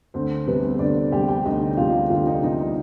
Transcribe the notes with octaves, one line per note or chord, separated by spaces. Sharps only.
D2 C4 C5
C3 G3 B3 B4
C4 C5
D2 D4 D5
C3 G3 G4 G5
G4 G5
D2 D#4 D#5
C3 G3 F4 F5
D2 F4 F5
D#4 D#5
C3 G3 D#4 D#5
D#4 D#5